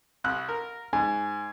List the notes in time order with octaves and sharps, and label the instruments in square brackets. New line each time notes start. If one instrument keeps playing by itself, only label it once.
[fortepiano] C2 F#6
A#4
[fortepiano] G#2 [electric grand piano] G#5